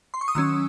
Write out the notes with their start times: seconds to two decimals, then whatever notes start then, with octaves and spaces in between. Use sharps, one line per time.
0.14 C6
0.21 C#6
0.28 D#6
0.35 D#3 F#3 C#4 E6